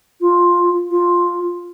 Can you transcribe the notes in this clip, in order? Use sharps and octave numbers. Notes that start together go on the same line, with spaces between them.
F4
F4